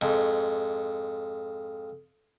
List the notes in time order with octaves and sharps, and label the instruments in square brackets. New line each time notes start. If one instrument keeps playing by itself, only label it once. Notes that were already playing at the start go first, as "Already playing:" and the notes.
[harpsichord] F2 G#2